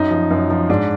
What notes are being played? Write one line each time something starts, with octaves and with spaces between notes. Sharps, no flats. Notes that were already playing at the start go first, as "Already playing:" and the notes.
Already playing: F#2 D#4
F3
F#2
F3
G#2 D4